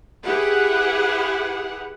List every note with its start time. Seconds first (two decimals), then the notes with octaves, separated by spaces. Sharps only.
0.25 E4 G4 G#4 B4 F#5